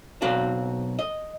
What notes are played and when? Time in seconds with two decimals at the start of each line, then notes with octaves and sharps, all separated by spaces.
0.22 B1 C4 F#4 F5
0.99 D#5